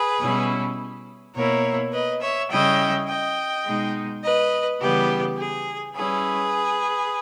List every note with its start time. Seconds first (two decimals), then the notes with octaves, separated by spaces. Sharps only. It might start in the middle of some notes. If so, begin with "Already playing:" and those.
Already playing: G#4 B4
0.19 B2 G3 C#4 E4
1.34 B2 A#3 E4 A#4 C#5
1.92 B4 D#5
2.20 C#5 E5
2.49 C#3 G3 C#4 E4 D#5 G5
3.07 D#5 G5
3.65 B2 G#3 D#4
4.23 B4 D#5
4.80 C#3 E3 G3 B3 G4
5.37 G#4
5.95 G3 C#4 E4 G#4 B4